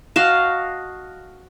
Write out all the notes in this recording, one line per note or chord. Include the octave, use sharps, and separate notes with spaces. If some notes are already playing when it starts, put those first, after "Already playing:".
F#4 D#5 F5 A5